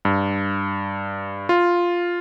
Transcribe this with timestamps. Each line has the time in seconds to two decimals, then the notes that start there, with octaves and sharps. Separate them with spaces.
0.05 G2
1.49 F4